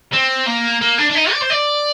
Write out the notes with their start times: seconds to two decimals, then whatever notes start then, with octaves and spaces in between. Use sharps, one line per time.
0.13 C4
0.47 A#3
0.81 A#3
0.98 D4
1.10 D4
1.15 D#4
1.32 D5
1.42 C5
1.50 D5